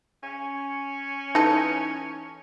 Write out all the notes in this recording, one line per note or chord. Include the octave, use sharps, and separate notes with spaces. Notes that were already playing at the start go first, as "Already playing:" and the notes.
C#4
E3 D#4 A4